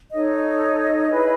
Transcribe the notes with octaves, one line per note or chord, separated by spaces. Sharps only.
D#4 A4 C#5 D#5
D#5
E4 G#4 B4